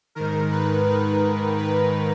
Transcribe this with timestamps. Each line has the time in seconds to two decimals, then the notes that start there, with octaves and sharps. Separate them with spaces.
0.15 G#2 D#3 A#4
0.51 B4
0.86 B4
1.58 B4